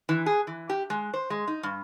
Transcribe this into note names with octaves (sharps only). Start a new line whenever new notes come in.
E3
G#4
E3
G4
G#3
C5
G#3
D#4
G2